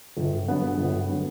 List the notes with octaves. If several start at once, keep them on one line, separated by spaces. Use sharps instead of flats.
G1
G2 D3 F#3 B3
G1
D3 F#3 B3